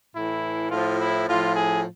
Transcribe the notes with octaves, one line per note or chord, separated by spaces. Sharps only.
A2 E3 E4
A2 F3 F4
E4
A2 F3 F4
G#4